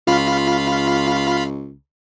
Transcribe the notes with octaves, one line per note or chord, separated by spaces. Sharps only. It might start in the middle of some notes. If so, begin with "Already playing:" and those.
C#2 F4 F5 B5